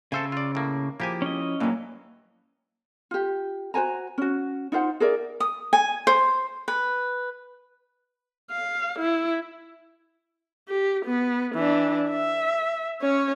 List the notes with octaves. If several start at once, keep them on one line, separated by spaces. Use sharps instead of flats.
C#3 A4 C5 C#5 E5 F5 G#5 E6
F4 D5
A2 A#3
F3 A#3 E4 G4 G#4 G#5
C#4 D#5
G2 E3 F#3 A#3
F4 G4
F#4 C5 G#5 A#5
C#4 F#4
D#4 F4 C5 F#5
G#4 A#4 D5 E5
D#6
G#5
C5
B4
F5
E4
G4
B3
E3 D4
E5
C#4 C#5